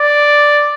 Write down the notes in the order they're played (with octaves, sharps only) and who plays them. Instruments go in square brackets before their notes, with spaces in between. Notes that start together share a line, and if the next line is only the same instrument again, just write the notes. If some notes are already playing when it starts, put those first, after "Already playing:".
Already playing: [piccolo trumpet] D5